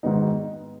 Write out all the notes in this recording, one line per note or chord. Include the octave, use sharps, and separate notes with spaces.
G#2 D#3 G#3 B3 D#4